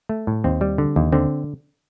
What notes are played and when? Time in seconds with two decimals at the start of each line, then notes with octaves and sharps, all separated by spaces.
0.09 A3
0.27 A2
0.44 D#2 C4
0.61 G3
0.78 D3
0.96 D#2
1.12 D3 C4